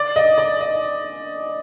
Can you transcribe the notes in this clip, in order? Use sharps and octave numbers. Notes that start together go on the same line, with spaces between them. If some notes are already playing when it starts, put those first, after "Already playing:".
Already playing: D5
D#5
D5
D#5